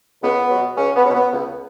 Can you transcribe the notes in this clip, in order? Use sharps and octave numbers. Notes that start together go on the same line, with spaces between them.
C#2 B3
B2 F#3
C#2 C#4
B3
B2 F#3 C#4
B3
C#2